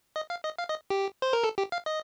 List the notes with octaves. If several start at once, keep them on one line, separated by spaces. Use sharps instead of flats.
D#5
F5
D#5
F5
D#5
G4
C5
A#4
A4
G4
F5
D#5